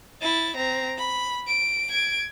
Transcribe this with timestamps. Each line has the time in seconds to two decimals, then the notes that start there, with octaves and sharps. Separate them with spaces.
0.22 E4 A6
0.57 C4 A#5
0.98 B5
1.47 D7
1.90 G#6 D7